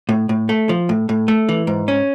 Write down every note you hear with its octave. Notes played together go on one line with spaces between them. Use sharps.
A2
A2
A3
F3
A2
A2
A3
E3
G#2
C#4